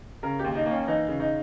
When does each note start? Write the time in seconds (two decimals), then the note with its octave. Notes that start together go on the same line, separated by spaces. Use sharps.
0.23 C#3 A#4
0.39 G4
0.44 D#2
0.55 D#4
0.66 A#3
0.71 C#4
0.87 E3 D#4
1.08 C#3
1.20 D#4